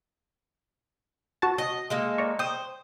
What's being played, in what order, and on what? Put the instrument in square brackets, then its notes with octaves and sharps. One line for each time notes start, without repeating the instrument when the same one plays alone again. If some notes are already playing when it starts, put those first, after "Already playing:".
[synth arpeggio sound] F#4 A5
[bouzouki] D#5
G#3 A#3 A4
[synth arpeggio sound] D5 A#5 C#6
[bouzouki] C5 [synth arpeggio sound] G5 D#6